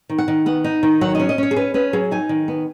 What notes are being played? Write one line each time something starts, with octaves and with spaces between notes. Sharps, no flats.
D#3
F#5
D#3
B3 F#5
D#4
D#3
F#3 F#5
C#4 D#5
D#5
C#4 C#5
G#4
C#4 B4
C#4 B4
F#3 G#4
D#4 G#5
D#3
B3